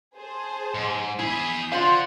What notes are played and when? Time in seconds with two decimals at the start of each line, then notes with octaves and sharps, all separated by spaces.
0.15 G#4 C5 A5
0.75 G#2
1.19 E2 E4 G#4 D#6 G6 B6
1.72 D4 F4 C5 F5 F#5